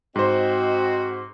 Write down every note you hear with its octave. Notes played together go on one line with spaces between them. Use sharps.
G#2 C4 F#4 C5 D#5